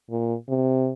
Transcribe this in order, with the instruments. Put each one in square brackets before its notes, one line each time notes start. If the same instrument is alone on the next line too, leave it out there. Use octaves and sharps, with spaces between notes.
[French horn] A#2
C3